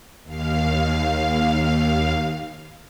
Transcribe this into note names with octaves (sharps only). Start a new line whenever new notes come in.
D#2 F5